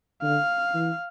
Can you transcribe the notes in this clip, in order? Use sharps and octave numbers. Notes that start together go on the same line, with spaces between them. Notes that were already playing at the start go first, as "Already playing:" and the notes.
D3 F5
E3